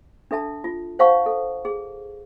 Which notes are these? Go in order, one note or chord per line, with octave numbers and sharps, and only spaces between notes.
D4 A4 E5 A5
F4
C5 C#5 F5 F#5 A5 C#6
A4
G#4